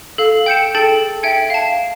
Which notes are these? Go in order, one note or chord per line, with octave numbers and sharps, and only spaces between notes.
A4 F5
G5 G6 C#7 E7
G#4 A4 G5 A5 A6
E5 G5 G#5 G#6 C#7
F5 A5